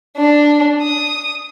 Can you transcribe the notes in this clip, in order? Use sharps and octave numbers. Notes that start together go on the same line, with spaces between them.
D4
D#6